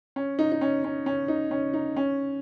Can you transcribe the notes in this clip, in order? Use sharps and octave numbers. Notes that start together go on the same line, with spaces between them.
C#4
D#4
D#4
C#4
C#4
C#4
D#4
C#4
D#4
C#4